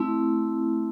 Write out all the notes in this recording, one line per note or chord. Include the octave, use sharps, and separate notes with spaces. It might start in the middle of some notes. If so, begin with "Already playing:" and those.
Already playing: A3 C4 E4